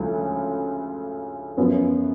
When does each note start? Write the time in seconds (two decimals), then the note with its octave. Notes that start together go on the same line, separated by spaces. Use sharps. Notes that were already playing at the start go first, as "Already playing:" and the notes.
Already playing: D2 C#3 F3 G#3
1.57 F#2 F3 B3